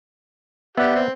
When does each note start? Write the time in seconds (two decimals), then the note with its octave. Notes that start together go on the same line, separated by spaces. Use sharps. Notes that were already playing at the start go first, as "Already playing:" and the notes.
0.77 B3 G4 D5 E5 F#5
0.95 C4